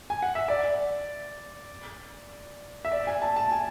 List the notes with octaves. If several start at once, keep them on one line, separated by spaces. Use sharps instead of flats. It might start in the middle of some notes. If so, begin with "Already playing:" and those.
G#5
F#5
E5
D5
E5
D5
G#5
A5
A5
G#5